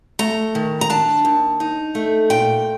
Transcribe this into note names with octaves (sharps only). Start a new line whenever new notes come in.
A3 A#5
D#3
A#5
D4 A5
D#2
D#4
A3
A#2 G5